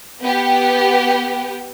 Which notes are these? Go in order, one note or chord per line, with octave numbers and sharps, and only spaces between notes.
B3 G4